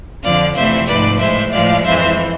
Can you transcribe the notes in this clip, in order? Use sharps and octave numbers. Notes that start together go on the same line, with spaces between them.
F2 D3 F3 D5 F5
F2 C3 E3 A3 C5 E5
G#2 F3 A3 B4 D5
A2 G#3 C5 E5
A2 F3 G#3 D5 F5
F2 E3 G#3 C5 E5